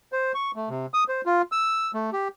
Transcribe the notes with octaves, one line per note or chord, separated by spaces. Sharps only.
C5
C#6
A3
C3
D#6
C5
F4
E6
A3
G4